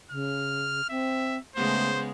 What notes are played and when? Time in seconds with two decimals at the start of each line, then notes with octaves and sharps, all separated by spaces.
0.11 C#3 F6
0.90 C4 E5
1.56 C#3 G#3 A3 B3 C5